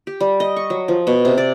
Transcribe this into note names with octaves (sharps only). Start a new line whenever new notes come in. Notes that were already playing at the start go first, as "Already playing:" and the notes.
G4
G3
D#5
C#6
F#3
F3
B2
C3
D5